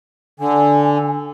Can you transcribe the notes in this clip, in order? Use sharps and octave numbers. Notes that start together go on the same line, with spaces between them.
D3 G#5